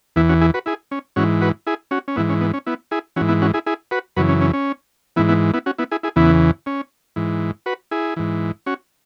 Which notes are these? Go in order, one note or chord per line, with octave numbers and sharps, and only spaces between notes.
E2 E3 B3 E4
C#4 F#4
E4 G#4
F#4 B4
E4 G#4
C#4
G#2 E3 C#4 F#4
F#4 B4
E4 G#4
C#4 F#4
C#4
G#2 E3 B3 E4
C#4
B3
C#4
B3 E4
E4 G#4
G#2 E3 C#4 F#4
B3 E4
C#4 F#4
E4 G#4
E4 G#4
F#4 B4
F#2 C#3 E3 F#4 B4
C#4
C#4
C#4
G#2 E3 B3 E4
B3 E4
B3 E4
C#4 F#4
B3 E4
E4 G#4
E4 G#4
E2 C#3 E3 B3 E4
C#4
G#2 E3
F#4 B4
E4 G#4
G#2 E3
C#4 F#4